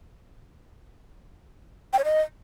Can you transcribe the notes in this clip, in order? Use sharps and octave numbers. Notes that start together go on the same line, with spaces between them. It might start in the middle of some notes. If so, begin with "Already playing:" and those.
G5
C#5
D#5